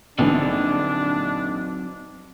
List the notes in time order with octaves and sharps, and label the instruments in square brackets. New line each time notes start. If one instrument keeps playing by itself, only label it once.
[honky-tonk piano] A#1 D3 E3 [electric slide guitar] F#3 C4 D#4 [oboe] D4